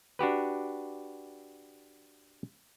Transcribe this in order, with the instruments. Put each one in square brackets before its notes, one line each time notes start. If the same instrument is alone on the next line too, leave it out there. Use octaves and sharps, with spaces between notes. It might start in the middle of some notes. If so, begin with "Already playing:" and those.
[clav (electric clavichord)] D4 F#4 G4 B4